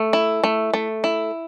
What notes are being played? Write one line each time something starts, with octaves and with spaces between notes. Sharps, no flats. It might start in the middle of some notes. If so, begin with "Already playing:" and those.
Already playing: A3
E4
A3
A3
E4